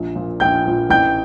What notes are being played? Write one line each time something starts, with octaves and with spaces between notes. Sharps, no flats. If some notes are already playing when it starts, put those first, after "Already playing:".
Already playing: A#1
A#2 F3
A#1 G5 G6
A#2 F3
A1 G5 G6